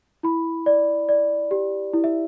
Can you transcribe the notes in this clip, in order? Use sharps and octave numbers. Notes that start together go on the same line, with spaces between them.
E4 B5
D5
D5
G4
E4
E5